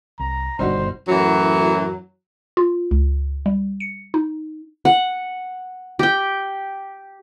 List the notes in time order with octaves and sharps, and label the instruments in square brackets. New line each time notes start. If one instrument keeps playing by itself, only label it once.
[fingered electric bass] C2 [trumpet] A#5
[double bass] G1 [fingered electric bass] G2 B2 [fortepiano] G3 D#4 F#4 [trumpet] C5
[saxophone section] F#2 A2 E3 F#3
[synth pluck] F4
C#2
G3
C#7
D#4
[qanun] F#5
G4 G5